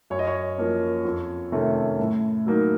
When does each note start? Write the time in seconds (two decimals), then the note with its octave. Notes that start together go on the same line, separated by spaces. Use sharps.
0.10 F#2 C#5
0.19 D#5
0.27 C#5
0.58 F3 A#3 C#4
1.05 F2
1.52 C3 D#3 A3 C#4
1.99 A2
2.46 F#3 A#3 D#4